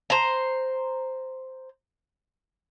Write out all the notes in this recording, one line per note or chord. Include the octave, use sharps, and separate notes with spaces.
C5 A#5